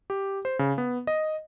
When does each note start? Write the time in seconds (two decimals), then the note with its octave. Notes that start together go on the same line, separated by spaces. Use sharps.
0.10 G4
0.45 C5
0.59 C#3
0.78 B3
1.07 D#5